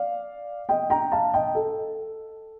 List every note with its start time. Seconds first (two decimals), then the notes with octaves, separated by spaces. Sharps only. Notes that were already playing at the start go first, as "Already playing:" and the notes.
Already playing: D5 F5
0.69 D#5 G5
0.90 G5 A#5
1.12 F5 A5
1.34 D#5 G5
1.55 A4